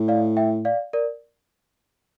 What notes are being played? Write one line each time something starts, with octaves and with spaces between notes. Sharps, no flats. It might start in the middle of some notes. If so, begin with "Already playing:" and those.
Already playing: A2
D5 F5
E5 G5
D5 F5
A#4 D5